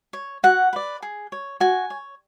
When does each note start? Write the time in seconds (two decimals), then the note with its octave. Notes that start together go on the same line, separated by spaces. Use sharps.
0.13 C#5
0.43 F#4 F#5
0.73 B4 D5
1.02 G#4
1.32 C#5
1.60 F#4 G#5
1.90 C#5